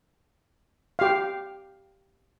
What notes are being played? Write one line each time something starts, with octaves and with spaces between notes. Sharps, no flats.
G4 F5